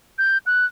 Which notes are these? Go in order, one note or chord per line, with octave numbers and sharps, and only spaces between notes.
G6
F#6